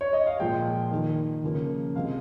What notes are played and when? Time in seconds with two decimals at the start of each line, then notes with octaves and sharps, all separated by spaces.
0.01 C#5
0.13 D#5
0.27 F5
0.39 A#2 F3 G#3 G5
0.91 D#3 A#3
1.44 C#3 F3 A#3
1.95 C3 F3 G#3 F5